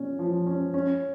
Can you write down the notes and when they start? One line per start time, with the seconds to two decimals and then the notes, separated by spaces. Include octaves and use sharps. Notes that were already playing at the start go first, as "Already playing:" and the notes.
Already playing: A#2 C#4
0.19 F3
0.47 C#4
0.74 C#4